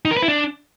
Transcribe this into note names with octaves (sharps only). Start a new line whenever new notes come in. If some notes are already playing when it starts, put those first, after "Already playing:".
D#4
A#4
B4
E4
D4